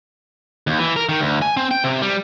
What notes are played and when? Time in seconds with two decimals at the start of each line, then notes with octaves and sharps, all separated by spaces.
0.67 D#2
0.79 E3
0.96 A#4
1.09 D#3
1.20 D2
1.42 G#5
1.57 C4
1.71 G5
1.84 C3
2.02 G3